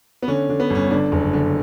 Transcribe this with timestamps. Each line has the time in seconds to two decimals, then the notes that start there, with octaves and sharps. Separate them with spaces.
0.22 B3
0.28 D3 C#4
0.49 D3
0.60 B3
0.70 G1 C#4
0.91 D3 D4
1.12 F#1
1.33 D3